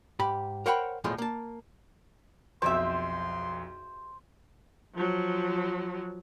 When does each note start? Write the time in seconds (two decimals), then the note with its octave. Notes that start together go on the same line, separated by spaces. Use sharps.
0.19 G#2 G4 B5
0.66 A#4 C5 C#5 F#5 G5 B5
1.04 B1 E2 A2 F3 G#3
1.18 A#3 A5
2.62 B1 F2 G4 G#4 C5 E5 C6
4.95 F3 F#3